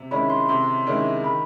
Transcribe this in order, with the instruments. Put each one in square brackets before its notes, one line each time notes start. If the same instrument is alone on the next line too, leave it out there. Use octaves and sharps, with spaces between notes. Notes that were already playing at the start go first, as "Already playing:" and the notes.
Already playing: [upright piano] C3
[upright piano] D#3 G#3 C#4 E4 [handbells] B5
[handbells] C6
[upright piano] C3 [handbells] C6
[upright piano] D#3 G#3 C#4 E4
[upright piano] D#3 [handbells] B5